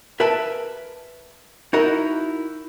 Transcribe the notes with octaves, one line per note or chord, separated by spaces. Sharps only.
A#4 B4 E5 G#5 A5
D#4 E4 F#4 A#4 D#5